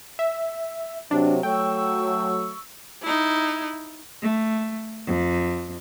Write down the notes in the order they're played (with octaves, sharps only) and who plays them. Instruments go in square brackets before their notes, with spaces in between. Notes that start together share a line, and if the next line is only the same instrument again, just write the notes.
[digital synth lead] E5
[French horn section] C3 F#3 [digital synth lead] D4
[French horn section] F#3 A3 [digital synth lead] G5 [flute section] C#6 E6
[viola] D#4 E4
[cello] A3
F2